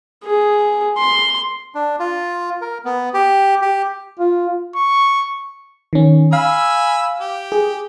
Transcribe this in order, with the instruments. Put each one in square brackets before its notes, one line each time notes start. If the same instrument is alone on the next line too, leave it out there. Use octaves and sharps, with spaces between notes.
[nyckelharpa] G#4
C6
[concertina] D4
F4
A#4
B3
G4
G4
[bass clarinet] F4
[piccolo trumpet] C#6
[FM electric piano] D#3 C#4
[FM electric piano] F5 [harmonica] G#5 B5 E6
[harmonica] G4
[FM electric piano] G#4